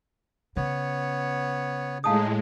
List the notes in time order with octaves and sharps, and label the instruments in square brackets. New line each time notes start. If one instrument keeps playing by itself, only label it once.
[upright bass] C#3 [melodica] B3 C#5
[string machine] A2 G#3 [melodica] D#4 G#4 [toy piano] F5 A5 D#6